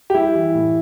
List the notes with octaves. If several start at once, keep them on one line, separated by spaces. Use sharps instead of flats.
G4
G3 E4
E3
A2